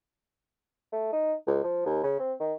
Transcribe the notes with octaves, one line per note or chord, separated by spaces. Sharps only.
A3
D#4
C#2
F3
D#2
C#3
C4
D#3